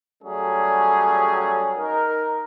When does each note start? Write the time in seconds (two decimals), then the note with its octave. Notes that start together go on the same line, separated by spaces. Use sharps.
0.23 F#3 G3 A3 C#4 G#4
1.77 D#4 A#4